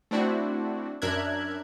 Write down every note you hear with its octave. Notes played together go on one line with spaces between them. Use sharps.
A3 C4 D4 E4 F#4
F#2 D4 A#4 E5 F#6 G#6